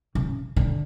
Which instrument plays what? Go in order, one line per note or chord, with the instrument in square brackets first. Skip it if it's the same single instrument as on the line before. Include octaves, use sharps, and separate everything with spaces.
[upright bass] C#3
D3